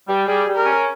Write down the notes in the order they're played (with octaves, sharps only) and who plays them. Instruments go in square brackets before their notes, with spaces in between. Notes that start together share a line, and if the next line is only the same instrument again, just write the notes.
[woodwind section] G3
[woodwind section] G3 [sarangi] G#4
[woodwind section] G3
[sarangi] A#4
[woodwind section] C#4